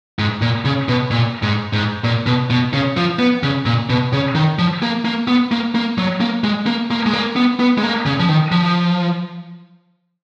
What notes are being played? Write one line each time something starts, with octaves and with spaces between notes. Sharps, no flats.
G#2
A#2
C#3
B2
A#2
G#2
G#2
A#2
B2
B2
C#3
F3
B3
C#3
A#2
B2
C#3
D#3
F3
A#3
A#3
B3
A#3
A#3
F#3
A#3
G#3
A#3
A#3
G#3
A#3
B3
B3
G#3
A#3
C#3
F3
D#3
F3